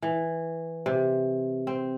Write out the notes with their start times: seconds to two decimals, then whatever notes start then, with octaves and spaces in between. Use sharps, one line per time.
0.02 E3
0.86 C3
1.67 C4